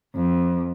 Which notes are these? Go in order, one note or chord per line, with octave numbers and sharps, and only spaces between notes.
F2